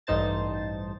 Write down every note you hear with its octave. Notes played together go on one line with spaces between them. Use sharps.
A1 G2 D#4 C5 A5 A6